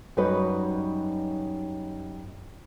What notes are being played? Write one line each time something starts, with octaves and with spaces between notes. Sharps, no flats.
F#2 G3 D#4 F#4 B4 D#5